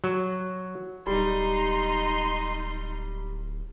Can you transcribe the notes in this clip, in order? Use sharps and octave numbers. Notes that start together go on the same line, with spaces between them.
F#3
D1 G3 D#4 C6